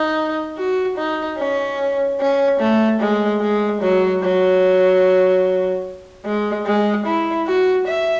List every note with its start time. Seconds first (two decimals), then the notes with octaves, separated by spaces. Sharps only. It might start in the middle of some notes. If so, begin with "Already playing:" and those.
Already playing: D#4
0.57 F#4
0.97 D#4
1.38 C#4
2.20 C#4
2.60 A3
3.00 G#3
3.41 G#3
3.82 F#3
4.23 F#3
6.25 G#3
6.66 G#3
7.06 E4
7.47 F#4
7.87 E5